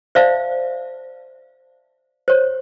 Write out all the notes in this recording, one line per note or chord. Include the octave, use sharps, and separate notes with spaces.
C5 D5 E5 F5 A5
C5 C#5